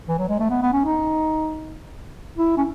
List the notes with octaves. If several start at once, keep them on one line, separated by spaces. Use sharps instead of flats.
E3
F#3
G#3
A3
B3
B3
C#4
D#4
E4
C#4